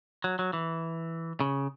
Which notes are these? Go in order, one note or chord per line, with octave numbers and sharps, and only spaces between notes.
F#3
F#3
E3
C#3